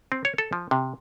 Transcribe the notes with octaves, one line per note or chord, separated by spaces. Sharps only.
C4
C#5
A4
F3
C3